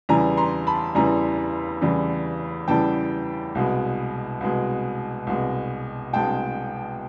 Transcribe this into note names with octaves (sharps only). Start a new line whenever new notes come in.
E2 C#3 E3 G3 G#5 A#5
A#5 C6
A5 B5
E2 C#3 E3 G3 G#5 A#5
E2 C#3 E3 G3
E2 C#3 E3 G3 G5 A5
C2 B2 G#3
C2 B2 G#3
C2 B2 G#3
C2 B2 G#3 G5 A5